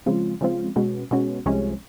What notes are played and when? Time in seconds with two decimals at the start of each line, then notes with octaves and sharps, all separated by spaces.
0.06 C#3 F3 G#3 C4 F4
0.41 C#3 F3 G#3 C4 F4
0.76 B2 G#3 C#4 F#4
1.11 B2 G#3 C#4 F#4
1.46 C2 C3 F3 G#3 C#4